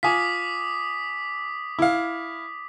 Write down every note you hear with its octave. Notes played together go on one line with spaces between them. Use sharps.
F4 G#5 D6 D#6 B6
E4 F5